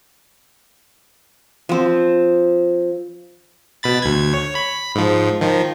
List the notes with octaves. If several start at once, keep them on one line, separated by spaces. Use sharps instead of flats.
F3 C4
B2 B5 A6
D2 G#6
C#5
B5
G#2 F3
D#3 F3